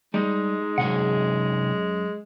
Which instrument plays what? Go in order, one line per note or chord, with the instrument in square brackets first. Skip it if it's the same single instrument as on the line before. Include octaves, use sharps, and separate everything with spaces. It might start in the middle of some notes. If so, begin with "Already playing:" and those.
[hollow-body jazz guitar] G3 [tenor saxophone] G#3 [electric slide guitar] D#4
[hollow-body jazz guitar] F#2 F#5 [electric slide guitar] C3 D#4 G#4